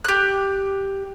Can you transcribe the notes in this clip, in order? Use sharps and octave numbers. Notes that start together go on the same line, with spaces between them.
G4 F#6